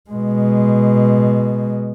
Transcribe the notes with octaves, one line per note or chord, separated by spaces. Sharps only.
B2 G#3